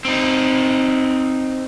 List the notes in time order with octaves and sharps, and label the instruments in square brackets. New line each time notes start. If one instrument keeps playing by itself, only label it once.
[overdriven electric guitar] C4 D#4